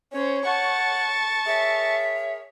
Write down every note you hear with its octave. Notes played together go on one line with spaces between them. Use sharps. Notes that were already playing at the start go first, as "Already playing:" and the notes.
C#4 C5 C#5
F#5 A5 C#6
G#4 A#4 C#5 E5